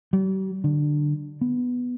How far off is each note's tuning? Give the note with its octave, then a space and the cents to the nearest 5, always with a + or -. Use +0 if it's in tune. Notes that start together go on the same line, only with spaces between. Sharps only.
G3 -45
D3 +15
B3 +0